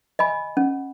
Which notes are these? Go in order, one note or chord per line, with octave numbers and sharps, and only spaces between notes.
D#5 G#5 B5
C#4